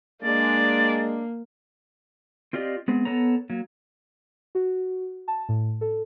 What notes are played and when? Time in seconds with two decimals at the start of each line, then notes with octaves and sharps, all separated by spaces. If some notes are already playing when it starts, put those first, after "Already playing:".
0.23 G#3 A#3 D4 D5
2.53 C4 F4 G4 D5 D#5
2.88 G#3 B3 C4
3.05 B3 A4 C#5 A#5
3.50 F#3 A#3
4.55 F#4
5.28 A5
5.49 A2
5.81 A4